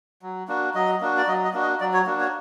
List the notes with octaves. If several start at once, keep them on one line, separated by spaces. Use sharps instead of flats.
F#3
A#3 D4 F#4
F#3 D#5
A#3 D4 F#4
D5
F#3 D#5
D#5
A#3 D4 F#4
D#5
F#3 D5
C#5
A#3 D4 F#4
C#5